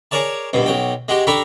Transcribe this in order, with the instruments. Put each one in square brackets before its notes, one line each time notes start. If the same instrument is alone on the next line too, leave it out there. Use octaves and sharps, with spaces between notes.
[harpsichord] G#4 A#4 C#5 D5 A5
A#1 G2 B2
B1 F#3 G5
G#3 F#4 G4
D4 G4 A4 A#5 B5 C#6